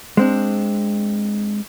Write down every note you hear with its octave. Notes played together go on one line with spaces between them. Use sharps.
G#3 C4 D4